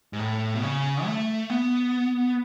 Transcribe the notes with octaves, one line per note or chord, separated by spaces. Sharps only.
G#2
A2
B2
C#3
A3
B3